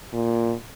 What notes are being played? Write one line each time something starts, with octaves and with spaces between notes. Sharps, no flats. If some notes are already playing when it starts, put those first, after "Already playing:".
A#2